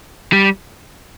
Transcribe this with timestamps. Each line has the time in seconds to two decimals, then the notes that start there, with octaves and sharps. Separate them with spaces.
0.33 G3